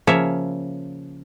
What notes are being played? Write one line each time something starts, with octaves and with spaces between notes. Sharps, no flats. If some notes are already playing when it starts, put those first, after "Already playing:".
C#3 F3 A#3 C#5 E5